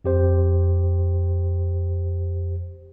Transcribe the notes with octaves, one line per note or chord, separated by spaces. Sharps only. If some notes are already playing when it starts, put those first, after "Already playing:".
F2 G4 C5